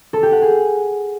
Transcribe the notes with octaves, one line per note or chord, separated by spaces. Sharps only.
A4
G4
F#5
G#4